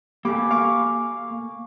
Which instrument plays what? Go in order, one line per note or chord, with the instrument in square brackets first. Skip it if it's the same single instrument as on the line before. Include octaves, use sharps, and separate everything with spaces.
[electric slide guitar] A#3 A4 G#5 [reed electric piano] G4 B5 D6
[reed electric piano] F5 C#6 D6